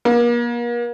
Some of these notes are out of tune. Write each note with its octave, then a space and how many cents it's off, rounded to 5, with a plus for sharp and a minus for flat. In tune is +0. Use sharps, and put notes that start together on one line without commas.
A#3 +40